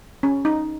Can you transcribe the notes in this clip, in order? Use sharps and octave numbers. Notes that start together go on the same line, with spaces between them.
C#4
D#4